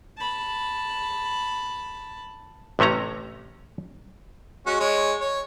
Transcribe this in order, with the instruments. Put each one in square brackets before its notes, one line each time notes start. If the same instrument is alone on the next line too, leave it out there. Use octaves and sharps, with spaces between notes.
[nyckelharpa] A5 B5
[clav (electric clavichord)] A1 C3 A3 C#4 A#5
[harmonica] G#3 C#4 F#4
G#3 C#5
C#5